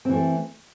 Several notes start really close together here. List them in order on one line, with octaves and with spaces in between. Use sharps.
C4 E3 A3